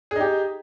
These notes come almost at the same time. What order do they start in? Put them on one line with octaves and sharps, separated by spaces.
G#4 D#4 G4